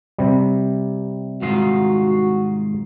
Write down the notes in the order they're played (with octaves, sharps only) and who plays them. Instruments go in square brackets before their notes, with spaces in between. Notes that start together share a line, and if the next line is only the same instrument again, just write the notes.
[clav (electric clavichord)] C3 G3
[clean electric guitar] G#2 D#3 F4 [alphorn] F#4